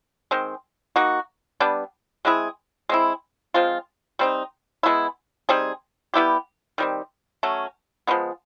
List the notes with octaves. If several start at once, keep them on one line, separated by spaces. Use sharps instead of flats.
D#3 G#3 C4
A#3 D#4 F#4
G3 B3 D4
G#3 C4 E4 G#4
G#3 C4 E4
F3 G#3 C4 F4
G3 C4 D#4
G#3 B3 E4
G3 C4 D#4 G#4
G3 B3 E4 G4
D#3 G3 C4
F#3 A3 C#4
F3 G#3 B3